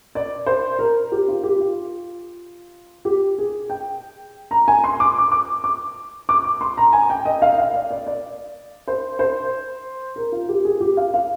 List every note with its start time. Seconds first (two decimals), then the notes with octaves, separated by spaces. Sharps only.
0.15 D5
0.46 C5
0.79 A#4
1.12 G4
1.28 F4
1.43 G4
1.60 F4
3.05 G4
3.38 G#4
3.70 G5
4.51 A#5
4.68 G#5
4.84 C6
5.00 D6
5.18 D6
5.32 D6
5.64 D6
6.29 D6
6.44 D6
6.61 C6
6.78 A#5
6.93 G#5
7.10 G5
7.25 D#5
7.42 F5
7.58 F5
7.74 D5
7.90 D5
8.07 D5
8.88 C5
9.19 C5
10.16 A#4
10.32 F4
10.49 G4
10.65 G#4
10.80 G4
10.97 F5
11.14 F5